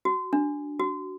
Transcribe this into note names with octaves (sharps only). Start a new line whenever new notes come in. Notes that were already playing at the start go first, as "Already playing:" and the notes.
F#4
D4
F#4